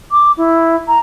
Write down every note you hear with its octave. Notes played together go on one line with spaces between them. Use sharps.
D6
E4
A#5